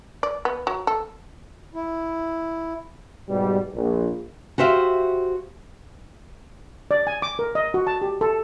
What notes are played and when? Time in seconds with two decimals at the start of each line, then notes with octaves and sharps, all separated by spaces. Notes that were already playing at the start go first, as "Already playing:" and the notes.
0.23 D5
0.45 B3
0.67 F#3
0.87 A4
1.74 E4
3.29 G#2 B2 G3
3.74 A#1
4.58 F#4 G4 C5 E5 F5
6.91 D5
7.07 G#5
7.22 D6
7.39 A#4
7.55 D#5
7.74 F#4
7.87 A5
8.02 G4
8.21 A4